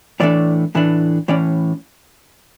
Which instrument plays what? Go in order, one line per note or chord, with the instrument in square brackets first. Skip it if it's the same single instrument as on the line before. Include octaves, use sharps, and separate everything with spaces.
[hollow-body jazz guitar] A2 E3 A3 D4 D5
A2 E3 A3 D4
A2 E3 C#4 D5